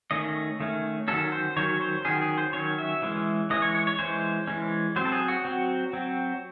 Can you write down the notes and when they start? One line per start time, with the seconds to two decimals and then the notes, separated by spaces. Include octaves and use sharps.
0.11 D#3 A3 C#4 D#5
0.60 D#3 A3 C#4
1.08 D#3 F#3 C#4 A4
1.32 C5
1.56 D#3 F#3 C#4 C#5
1.81 C5
2.05 D#3 F#3 C#4 G#4
2.21 G#4
2.38 C5
2.53 D#3 F#3 C#4 C#5
2.78 E5
3.02 E3 G#3 C#4
3.50 E3 G#3 C#4 D#5
3.62 C#5
3.75 C#5
3.87 C#5
3.99 E3 G#3 C#4 C5
4.47 E3 G#3 C#4
4.96 F#3 C4 C5
5.05 A4
5.12 G#4
5.28 F#4
5.45 F#3 C4
5.93 F#3 C4